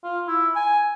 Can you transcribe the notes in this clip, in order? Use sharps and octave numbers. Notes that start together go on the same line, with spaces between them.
F4
E4
G#5